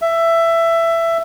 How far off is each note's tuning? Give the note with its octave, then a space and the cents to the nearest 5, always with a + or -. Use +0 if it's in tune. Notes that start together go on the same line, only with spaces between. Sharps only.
E5 +15